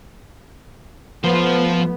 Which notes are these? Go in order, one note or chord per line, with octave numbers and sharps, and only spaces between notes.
F3 A3 B3 C5